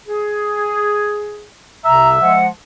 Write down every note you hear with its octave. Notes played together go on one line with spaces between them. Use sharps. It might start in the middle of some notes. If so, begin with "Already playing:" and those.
G#4
C2 C3 E5 A#5
F3 G#3 F#5